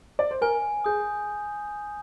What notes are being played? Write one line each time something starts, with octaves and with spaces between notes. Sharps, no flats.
D5
C5
A#4 G#5
G#4 D#6 G6